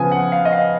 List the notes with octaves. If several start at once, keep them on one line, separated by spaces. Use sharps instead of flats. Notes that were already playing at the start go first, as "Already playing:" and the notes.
Already playing: C#3 F3 B3 G#5 D#6
F#5
F5
D#5
F5